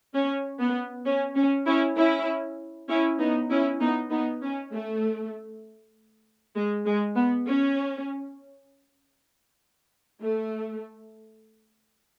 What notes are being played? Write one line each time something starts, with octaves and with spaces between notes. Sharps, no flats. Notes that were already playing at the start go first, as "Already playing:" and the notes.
C#4
B3
C#4
C#4
C#4 E4
C#4 E4
C#4 E4
B3 D#4
C#4 E4
B3 D#4
B3 D#4
C#4
A3
G#3
G#3
B3
C#4
A3